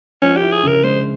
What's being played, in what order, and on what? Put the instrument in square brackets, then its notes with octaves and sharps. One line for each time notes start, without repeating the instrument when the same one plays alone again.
[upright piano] F3 [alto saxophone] C#4
[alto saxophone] G4
[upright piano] E4
[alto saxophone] G#4
[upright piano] C#3 [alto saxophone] A#4
[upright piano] G#3 [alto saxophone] C5